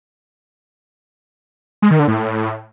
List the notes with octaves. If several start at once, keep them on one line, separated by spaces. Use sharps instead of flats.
G#3
D#3
D3
A2